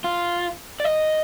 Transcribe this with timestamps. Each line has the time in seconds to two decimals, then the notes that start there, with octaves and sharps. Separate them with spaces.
0.04 F4
0.80 D5
0.84 D#5